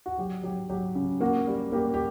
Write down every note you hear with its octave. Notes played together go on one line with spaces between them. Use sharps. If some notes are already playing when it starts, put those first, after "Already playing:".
F#4
F#3 G4
F#3 G4
F#3 G4
C#3
A#3 F#4
G3
A#3 G4
G4